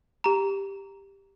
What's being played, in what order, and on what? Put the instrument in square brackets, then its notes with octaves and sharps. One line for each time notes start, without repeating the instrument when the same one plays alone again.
[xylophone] G4 A#5